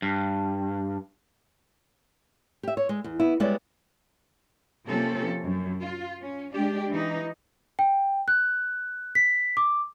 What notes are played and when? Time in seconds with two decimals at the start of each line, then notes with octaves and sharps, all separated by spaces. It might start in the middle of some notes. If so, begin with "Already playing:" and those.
0.02 G2
2.63 G4 E5
2.77 C#5
2.89 G#3
3.04 E2
3.20 B3 E4
3.40 G3 G#3 B3 E4 C#5 D5
4.87 C3 F3 A#3 C4 C#4 A4
5.42 F#2
5.80 F4
6.21 C#4
6.53 G#3 D4 G4
6.90 E3 D#4
7.79 G5
8.28 F#6
9.15 B6
9.57 D6